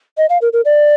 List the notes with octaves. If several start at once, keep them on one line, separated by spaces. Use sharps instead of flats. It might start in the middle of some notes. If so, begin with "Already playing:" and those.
D#5
F5
A#4
A#4
D5